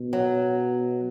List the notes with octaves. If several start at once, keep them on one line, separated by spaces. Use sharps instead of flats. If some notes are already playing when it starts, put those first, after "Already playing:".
Already playing: B2
F#3